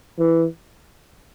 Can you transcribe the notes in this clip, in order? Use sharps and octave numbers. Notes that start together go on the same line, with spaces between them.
E3